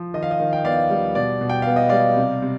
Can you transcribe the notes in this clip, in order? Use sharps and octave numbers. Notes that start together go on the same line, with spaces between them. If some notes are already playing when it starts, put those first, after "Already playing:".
Already playing: F3
D#3 D#5
F5
D#5
D#3
G5
B3 D5 F5
G3
B2 D5
B2
G5
B3 F5
D#5
G3 D5 F5
C3
C3